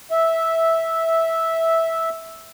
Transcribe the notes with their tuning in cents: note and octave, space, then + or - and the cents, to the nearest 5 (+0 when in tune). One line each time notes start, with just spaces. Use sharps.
E5 -10